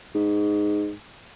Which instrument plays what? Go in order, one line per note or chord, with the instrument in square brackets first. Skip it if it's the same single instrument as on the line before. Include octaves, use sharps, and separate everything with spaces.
[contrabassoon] G#2